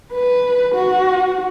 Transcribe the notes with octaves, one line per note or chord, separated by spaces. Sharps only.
B4
F#4